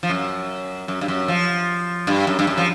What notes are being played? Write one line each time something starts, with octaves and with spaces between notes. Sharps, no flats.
F3
F#2
F#2
G2
F#2
F3
G2
F#2
G2
F#2
F3